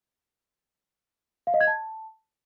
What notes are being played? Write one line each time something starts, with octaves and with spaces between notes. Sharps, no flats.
F5
D#5
G#6
A5